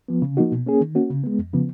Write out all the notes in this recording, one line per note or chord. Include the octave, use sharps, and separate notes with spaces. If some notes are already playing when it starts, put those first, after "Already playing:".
F3 B3
C#3
F3 A#3 D#4 F#4
B2
A#3 C#4 G#4
D#3
A#3 C#4 F#4
C#3
G#3 B3
F2
C#3 F3 B3